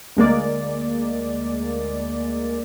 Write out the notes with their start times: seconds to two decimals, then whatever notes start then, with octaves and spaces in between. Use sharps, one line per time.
0.17 D2 G#3 A#3 D5